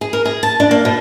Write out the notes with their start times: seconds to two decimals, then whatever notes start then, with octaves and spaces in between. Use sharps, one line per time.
0.01 G#4
0.13 A#4
0.25 G#4
0.43 A5
0.60 D4
0.71 A#3
0.85 B2